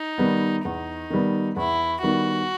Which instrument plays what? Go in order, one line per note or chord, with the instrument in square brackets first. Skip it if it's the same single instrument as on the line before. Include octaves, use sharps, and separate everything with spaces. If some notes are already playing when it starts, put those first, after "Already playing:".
Already playing: [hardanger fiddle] D#4
[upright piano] D#3 G3 B3
[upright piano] E2 [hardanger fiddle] D#4
[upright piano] D#3 G3 B3
[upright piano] E2 [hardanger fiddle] E4
[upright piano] D#3 G3 B3 [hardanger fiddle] F#4